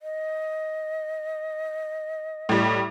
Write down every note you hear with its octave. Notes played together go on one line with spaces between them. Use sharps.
D#5
A2 G3